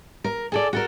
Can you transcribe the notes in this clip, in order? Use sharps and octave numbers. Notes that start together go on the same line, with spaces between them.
A#4
G#4 A4 D5
F#4 A4 A#4